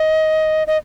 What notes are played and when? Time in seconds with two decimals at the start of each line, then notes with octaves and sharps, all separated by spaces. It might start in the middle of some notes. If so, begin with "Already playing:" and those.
Already playing: D#5
0.67 D#5